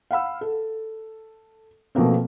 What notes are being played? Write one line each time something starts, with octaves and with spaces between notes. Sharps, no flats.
F5 F#5 B5 E6
A4
B2 F3 A3 A#3 C4